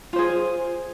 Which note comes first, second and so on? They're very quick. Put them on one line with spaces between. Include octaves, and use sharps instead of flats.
F4 C5 G#4